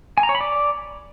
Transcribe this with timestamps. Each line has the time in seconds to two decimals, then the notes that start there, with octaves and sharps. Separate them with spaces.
0.18 G#5
0.23 A#5
0.29 C#5
0.35 B5
0.41 D5